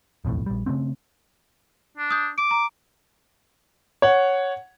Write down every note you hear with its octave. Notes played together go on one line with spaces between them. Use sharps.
D#1 B1 F2 A2
A#1 G3
C#3 E3 A3 C4
D4
D#6 G6
D6 D7
A#5
C#5 F#5